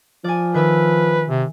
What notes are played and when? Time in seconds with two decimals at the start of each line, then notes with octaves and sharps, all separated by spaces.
0.24 F3 D5 G#5
0.54 D#3 B4 E5 E6
1.29 C3